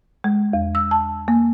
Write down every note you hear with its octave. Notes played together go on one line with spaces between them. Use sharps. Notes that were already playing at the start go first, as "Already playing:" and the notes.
G#3
E2
E6
A5
A#3